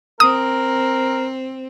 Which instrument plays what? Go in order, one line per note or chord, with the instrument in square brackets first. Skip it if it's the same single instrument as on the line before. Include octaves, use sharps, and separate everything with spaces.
[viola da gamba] C4 [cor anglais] A#4 [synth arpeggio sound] D#6